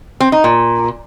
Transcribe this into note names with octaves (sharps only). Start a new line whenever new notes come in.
C4
D#4
A#2